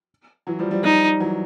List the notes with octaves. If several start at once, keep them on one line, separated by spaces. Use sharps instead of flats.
E3 F#3
F3 G3
F3 G3
F3 G3 D#4
E3 F#3